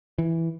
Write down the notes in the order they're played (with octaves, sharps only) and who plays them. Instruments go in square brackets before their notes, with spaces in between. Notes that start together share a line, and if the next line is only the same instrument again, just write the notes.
[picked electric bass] E3